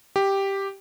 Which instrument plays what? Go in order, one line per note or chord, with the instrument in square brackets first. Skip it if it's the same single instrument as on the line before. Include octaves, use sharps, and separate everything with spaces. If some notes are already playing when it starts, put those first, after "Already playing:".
[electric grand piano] G4